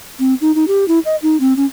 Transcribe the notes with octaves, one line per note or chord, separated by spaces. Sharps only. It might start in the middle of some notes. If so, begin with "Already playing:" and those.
C4
D#4
D#4
G4
E4
D#5
D#4
C4
C#4